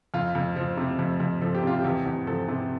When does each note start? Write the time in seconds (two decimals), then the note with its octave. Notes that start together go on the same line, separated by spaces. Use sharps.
0.14 F2 F4
0.35 F2
0.56 F3
0.77 C3
0.99 F2
1.20 F2
1.42 F3 A4
1.55 G4
1.63 C3 F4
1.79 G4
1.84 E2
2.06 E2
2.27 F3 A4
2.48 C3